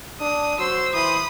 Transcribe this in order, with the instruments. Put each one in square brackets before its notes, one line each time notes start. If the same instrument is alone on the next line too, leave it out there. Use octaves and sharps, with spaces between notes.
[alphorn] D4 [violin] D#6
[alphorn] F#3 [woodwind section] C5 C6 [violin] E6
[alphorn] E3 [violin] B5 D#6